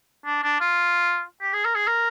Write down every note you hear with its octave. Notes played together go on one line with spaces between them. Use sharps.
D4
D4
F4
G4
G#4
A#4
G#4
A#4